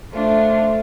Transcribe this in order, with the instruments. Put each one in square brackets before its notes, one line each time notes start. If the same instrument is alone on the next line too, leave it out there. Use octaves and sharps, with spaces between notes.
[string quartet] A3 D4 F4 [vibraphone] A4 C5 E5